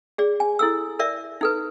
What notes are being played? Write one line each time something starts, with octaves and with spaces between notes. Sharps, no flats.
G#4 D5
G#5
E4 A4 E6
A#4 D5 E5
D#4 A4 B4